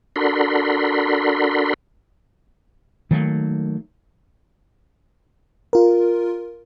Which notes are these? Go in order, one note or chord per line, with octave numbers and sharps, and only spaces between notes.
D4 F#4 A4 A#4 B5 C6
D#3 F#3 A3 A#3
F4 A#4